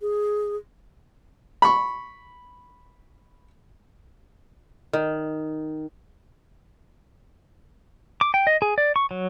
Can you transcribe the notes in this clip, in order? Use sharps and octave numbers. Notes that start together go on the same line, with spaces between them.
G#4
B5 C#6
D#3
D6
G5
D#5
G#4
D5
C#6
F#3